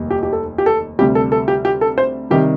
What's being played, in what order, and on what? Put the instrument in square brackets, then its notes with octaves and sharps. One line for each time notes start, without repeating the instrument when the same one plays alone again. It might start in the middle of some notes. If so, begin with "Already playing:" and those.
Already playing: [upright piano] F1 D#2 D#3 G3
G4
G4
A4
G4
A4
D2 C3 G3 G4
A4
A4
G4
G4
A4
C5
C3 D#3 G3 G4